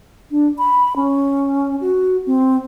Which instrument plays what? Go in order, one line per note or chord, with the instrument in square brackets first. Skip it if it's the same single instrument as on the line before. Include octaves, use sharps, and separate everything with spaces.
[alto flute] D4
B5
C#4
F#4
C4